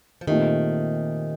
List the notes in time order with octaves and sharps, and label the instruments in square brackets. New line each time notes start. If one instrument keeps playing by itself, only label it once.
[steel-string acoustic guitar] F3
[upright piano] A#2 A3 C4 D#4 G4 [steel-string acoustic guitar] D#3